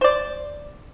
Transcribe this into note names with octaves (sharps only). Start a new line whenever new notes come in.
C5 D5